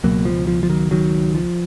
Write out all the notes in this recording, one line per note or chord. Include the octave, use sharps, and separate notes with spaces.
C#2 B2 F#3 A#3
F3
F3
F3
D#3 F#3
D#3 F#3
F3